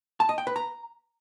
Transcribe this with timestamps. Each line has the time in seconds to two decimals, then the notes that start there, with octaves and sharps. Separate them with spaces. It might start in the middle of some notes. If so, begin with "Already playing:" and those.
0.20 A5
0.29 D#5
0.38 G5
0.47 B4
0.56 A#5